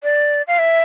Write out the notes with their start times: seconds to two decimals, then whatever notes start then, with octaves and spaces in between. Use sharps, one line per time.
0.03 D5
0.47 F5
0.59 E5